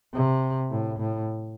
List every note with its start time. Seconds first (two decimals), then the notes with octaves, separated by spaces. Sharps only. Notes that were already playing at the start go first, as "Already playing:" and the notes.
0.14 C3
0.70 A2
0.99 A2